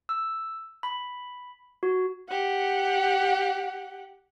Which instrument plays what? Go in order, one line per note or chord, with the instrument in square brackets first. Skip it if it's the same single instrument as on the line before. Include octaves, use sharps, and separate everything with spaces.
[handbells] E6
B5
F#4
[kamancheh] G4 F#5